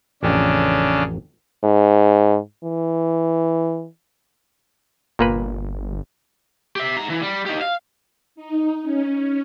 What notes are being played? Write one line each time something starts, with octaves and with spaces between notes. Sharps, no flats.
A1 F2 C#3 C#4 D4 G5
G#2
E3
G1 A#2 A#3 B4
G4 E5
G#2 A#5
E3
G3
D#4 G4
F5
D#4
C#4